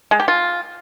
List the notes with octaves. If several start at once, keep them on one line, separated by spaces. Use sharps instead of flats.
G#3
G4
F4